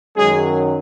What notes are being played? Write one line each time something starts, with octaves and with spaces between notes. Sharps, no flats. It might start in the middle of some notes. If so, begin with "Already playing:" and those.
F#2 D#3 F#3 G#3 C#4 G#4